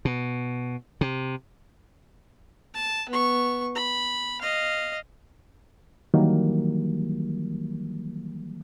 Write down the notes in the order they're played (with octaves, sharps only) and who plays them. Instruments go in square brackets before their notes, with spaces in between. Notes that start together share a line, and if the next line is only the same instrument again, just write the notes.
[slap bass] B2
C3
[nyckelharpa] A5
B3 C#6
B5
D#5 F5
[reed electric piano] D#3 E3 F#3 G3 A#3